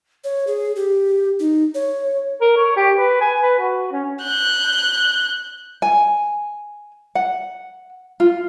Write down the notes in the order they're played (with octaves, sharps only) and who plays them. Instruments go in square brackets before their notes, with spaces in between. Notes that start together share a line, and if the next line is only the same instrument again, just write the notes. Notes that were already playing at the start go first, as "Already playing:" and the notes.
[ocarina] C#5
G#4
G4
D#4
C#5
[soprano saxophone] A#4
C#5
G4
B4
G#5
B4
F#4
C#4
[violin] F#6 G6
[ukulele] G#5
F#5
F4